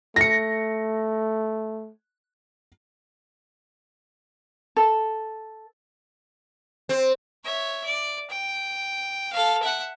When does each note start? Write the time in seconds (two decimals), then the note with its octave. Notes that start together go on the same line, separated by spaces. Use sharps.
0.16 A3 A#6 C#7
4.77 A4
6.89 C4
7.44 C#5 E5
7.85 D5
8.30 G5
9.33 A4 F5
9.62 E5 F#5